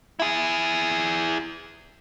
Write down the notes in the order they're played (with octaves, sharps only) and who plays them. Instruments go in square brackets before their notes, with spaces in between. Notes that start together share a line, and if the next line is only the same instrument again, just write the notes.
[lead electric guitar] E4 G#4